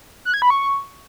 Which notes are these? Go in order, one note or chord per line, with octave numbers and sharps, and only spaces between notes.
F#6
G#6
B5
C#6